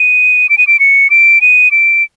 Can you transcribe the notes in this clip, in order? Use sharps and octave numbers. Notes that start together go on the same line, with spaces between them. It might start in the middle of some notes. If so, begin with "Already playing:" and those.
Already playing: D#7
D7
D#7
D7
C#7
D7
D#7
D7